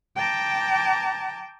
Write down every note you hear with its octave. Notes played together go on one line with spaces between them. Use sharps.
G5 A5 A#5 D6